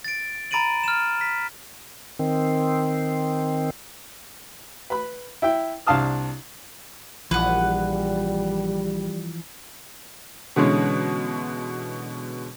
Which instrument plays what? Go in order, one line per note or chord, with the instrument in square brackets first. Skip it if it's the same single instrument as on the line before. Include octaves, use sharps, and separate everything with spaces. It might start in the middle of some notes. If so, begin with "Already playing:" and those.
[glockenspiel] A6 D7
A#5 B5 A6 D7 D#7 F#7
F6 E7
B6
[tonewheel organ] D#3 C4
[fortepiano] B4 B5
E4 E5 G5
C2 D4 F5 A5 D#6 F6
[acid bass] A#1 [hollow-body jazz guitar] E3 F3 [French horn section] G3 [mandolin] B4 F#5
[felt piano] B2 D3 E3 G#3 C#4